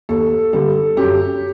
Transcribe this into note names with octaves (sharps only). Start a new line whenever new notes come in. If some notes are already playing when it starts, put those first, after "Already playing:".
D#2 A4
D3 G3 A4
F#2 G4